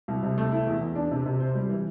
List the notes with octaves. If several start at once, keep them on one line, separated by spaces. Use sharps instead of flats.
C2
C3
A3
E4
E2
E2
D4
C3
C3
C5
G3
E3